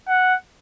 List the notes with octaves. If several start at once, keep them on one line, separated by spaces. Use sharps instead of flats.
F#5